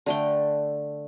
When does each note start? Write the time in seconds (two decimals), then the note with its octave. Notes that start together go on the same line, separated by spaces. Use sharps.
0.06 D3 A3 G5